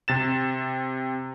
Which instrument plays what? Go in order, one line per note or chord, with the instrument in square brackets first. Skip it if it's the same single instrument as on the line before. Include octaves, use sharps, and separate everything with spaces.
[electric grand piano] C3 A6 E7